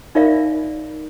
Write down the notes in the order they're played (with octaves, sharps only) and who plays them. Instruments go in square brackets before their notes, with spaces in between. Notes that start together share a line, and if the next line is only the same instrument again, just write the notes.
[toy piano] D#4 F4 A#4 D5 E5 F5